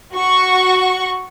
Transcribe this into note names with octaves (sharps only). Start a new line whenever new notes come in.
F#4 C#6